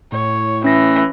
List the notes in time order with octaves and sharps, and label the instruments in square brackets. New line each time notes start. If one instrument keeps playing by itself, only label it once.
[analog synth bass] A2 [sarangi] C#5
[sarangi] E3 [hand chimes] C#4 A#6